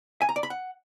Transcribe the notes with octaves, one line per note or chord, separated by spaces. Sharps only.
G#5
A#5
D5
B5
F#5